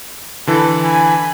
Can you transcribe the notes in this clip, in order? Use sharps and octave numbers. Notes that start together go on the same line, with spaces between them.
D3 E3 A4 B4
G#5 B5